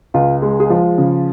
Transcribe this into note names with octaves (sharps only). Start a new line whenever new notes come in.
C#2 F4
G#3
G#4
F3 F4
C#3